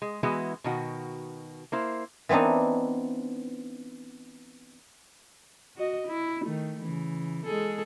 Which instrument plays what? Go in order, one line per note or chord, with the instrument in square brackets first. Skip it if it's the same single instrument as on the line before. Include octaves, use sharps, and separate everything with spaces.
[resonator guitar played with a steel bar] G#3
E3 G#3 B3 E4 F#4
B2 D#3 F#4
A#3 E4 C5
[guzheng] E3 B3 C4 D4 D#4
[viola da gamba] F#4 D#5
E4
D#3 A3
C#3 E3
G#3 G#4 A4